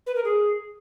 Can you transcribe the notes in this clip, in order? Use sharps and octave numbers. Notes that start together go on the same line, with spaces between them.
B4
A#4
G#4